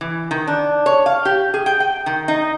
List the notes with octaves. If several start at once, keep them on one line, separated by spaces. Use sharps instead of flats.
E3
D#3
D4
C#5
F5
G4
G#4
G5
G5
D#3
D#4